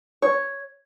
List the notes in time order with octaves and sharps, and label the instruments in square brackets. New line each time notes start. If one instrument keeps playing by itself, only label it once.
[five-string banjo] C#5